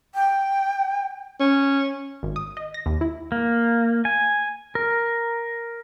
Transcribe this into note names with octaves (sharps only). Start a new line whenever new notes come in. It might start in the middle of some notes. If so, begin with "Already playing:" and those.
G5
C#4
G#1
D#6
D#5
A#6
D#2
E4
A#3
G#5
A#4